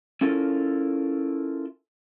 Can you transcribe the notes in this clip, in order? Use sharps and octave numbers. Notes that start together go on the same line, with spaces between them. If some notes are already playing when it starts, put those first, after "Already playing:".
C#4 E4 F4 A4 A#4